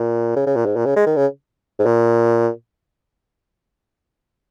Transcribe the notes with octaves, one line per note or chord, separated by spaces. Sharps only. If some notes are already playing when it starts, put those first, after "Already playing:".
Already playing: A#2
C#3
C#3
A#2
G#2
A#2
C#3
G#3
D#3
C#3
G#2
A#2